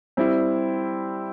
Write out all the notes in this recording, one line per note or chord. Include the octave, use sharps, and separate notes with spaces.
G3 C4 E4